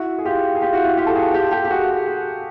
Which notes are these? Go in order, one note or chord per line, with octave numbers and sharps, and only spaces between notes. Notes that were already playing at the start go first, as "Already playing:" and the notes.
Already playing: E4 F#4
G#4
F4 G4
G#4
F4 G4
E4 F#4
E4 F#4
F4 G4
A4
F#4 G#4
F4 G4
G4 A4
G4
F#4 G#4